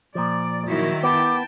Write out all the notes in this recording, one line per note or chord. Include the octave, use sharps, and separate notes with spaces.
A#2 F3 D5
D#3 F#3 E4
B3 G5 A5 D6